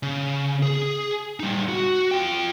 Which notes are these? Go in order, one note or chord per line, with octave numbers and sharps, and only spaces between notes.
C#3
G#4
G3 D#4
F#4
F4 G5